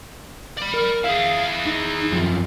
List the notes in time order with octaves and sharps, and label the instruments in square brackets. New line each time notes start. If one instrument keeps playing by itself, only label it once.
[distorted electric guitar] D5 B5
[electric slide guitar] A#4
[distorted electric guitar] E4 G#4 [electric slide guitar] F5
[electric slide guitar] D#4
F#2 F3